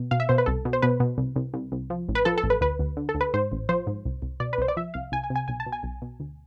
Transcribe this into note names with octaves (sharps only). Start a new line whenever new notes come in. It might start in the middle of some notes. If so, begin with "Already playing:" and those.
Already playing: B2
B2 F5
E5
B2 C5
B4
C2 A4
B2
C5
B2 B4
B2
C2
C2
C2
C2
F3
A1
B4
F3 A4
A4
A1
B4
D2 B4
D2
D3
A4
D2
B4
G#2 C5
A1
F3 C5
G#2
C2
C2
B2 D5
B4
C2 C5
D5
F3 E5
C2 F5
C2 G#5
G#5
C3
G#5
B1 G#5
A5
B2
G#5
B1
B2
D2